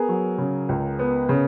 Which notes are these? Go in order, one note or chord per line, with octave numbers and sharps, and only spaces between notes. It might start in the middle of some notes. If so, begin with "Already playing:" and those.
Already playing: B3 G#4 A#4
F#3
C#3
C#2
B3
C#3